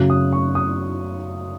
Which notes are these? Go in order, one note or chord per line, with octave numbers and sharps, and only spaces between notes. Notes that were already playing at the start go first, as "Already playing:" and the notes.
Already playing: F#2 C#3 F#3 F#6
D#6
C#6
D#6